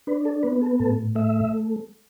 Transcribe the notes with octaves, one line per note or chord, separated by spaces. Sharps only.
D4 B4
A4
B3 B4
A4
A2 A4
A3 E5